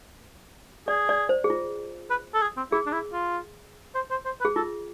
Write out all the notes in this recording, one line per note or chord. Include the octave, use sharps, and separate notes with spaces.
G#4 D5
D5
C5
G#4
F4
B4
A4
G#4
C4
E4 G#4
D4
E4
F4
C5
C5
C5
B4
G#4
F4 A4